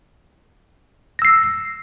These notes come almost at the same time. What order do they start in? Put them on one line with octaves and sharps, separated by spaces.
A#6 E6 C7